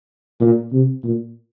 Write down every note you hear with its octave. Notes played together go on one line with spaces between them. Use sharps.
A#2
C3
A#2